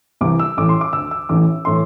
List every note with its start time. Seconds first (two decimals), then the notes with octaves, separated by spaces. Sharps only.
0.21 C2 C3 E3 D6
0.39 E6
0.57 A1 A2 E3 D6
0.69 C6
0.81 D6
0.93 D2 D3 E6
1.11 E6
1.29 A1 A2 E3 D6
1.65 A2 E3 C6